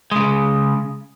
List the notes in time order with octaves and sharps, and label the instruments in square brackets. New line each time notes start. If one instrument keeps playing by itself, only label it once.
[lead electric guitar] C#3 G#3